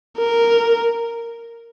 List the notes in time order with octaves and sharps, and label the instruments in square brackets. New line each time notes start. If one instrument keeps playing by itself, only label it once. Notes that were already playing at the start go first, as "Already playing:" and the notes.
[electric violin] A#4